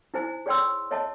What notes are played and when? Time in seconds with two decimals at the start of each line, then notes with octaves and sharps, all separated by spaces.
0.14 D#4 E4 C5 G#5
0.46 G#4 C#5 D5 G5 C6 E6
0.91 C#5 D#5 E5 A5